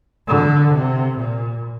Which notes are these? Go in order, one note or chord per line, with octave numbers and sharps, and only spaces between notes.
D3
C3
A#2